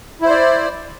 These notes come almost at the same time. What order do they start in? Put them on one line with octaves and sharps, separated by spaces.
E4 C5 D5